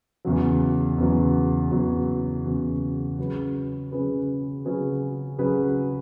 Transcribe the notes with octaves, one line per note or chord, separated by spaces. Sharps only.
E2 C#3 F#3
E2 C#3 F#3
E2 C#3 F#3
E2 C#3 F#3
C#3 F#3 C#4 G#4 B4
C#3 F#3 C#4 G#4 B4
C#3 F#3 C#4 G#4 B4
C#3 F#3 C#4 G#4 B4